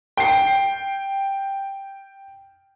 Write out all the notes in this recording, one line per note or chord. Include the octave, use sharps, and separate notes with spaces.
G5 C7